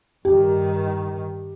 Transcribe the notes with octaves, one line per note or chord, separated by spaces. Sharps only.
G2 D#3 G4